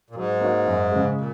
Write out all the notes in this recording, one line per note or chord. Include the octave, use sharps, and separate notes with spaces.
A#2
G#2 F#3
A#3 D#4 F#4 C#5
F#2
C#3 G#3
A#2